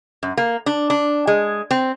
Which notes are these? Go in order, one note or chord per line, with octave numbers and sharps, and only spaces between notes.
F#2
A#3
D4
D4
G#3
C4